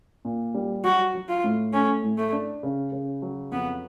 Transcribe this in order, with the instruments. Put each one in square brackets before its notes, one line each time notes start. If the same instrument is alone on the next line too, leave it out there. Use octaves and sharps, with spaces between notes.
[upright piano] A#2
G3
[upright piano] F#3 [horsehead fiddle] F#4
[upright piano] F#3
[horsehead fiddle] F4
[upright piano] A2
[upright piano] A3 [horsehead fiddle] C#4
[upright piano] A2
[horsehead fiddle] A3
[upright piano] D4
C#3
C#3
F#3
[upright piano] F2 [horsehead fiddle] B3